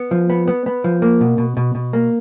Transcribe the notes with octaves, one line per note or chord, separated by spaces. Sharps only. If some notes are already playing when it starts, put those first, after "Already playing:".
Already playing: B3
F3
B3
B3
B3
F3
A#3
B2
B2
B2
B2
A#3